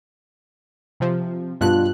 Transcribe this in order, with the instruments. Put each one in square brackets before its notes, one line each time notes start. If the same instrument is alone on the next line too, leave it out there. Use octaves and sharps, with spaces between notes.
[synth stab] C3 F3
[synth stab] G2 B2 F#6 [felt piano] F4 A5